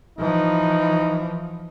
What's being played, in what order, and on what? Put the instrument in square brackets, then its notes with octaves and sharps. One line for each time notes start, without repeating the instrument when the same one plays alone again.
[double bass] E3 F3 [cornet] D#4